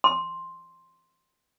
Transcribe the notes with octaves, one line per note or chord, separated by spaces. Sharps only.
C6